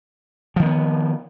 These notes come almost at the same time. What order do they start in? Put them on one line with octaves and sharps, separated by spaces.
F3 D#3 A#3 B3